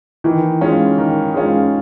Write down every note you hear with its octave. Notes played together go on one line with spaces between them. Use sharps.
D#3 E3
G#3 C#4 F4
D#3
G#3 C#4 F4